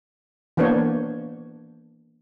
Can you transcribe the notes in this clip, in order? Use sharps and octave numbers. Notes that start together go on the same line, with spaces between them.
E3 A#3 B3 D4 C5 C#5